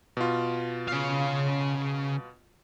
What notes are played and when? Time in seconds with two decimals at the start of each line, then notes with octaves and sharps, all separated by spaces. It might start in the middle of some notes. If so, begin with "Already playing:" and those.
0.17 B2 F4
0.88 C#3 F5